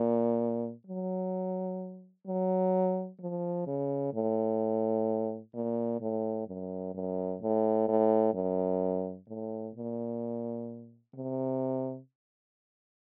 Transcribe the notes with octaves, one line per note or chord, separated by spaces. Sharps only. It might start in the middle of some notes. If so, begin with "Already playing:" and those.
Already playing: A#2
F#3
F#3
F3
C#3
A2
A#2
A2
F#2
F#2
A2
A2
F#2
A2
A#2
C3